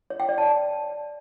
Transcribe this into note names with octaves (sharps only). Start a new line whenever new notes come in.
C#5
G5
D5
A5